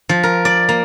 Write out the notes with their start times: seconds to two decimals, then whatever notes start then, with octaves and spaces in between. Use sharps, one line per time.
0.09 F3
0.23 A#4
0.45 D5
0.69 A#3